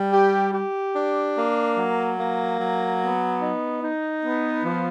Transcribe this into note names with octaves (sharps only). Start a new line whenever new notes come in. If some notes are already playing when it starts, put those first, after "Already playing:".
Already playing: G3
G4
G4
D4
A#3
F#3
A#3
F#3
B3
D#4
D#4
B3
F3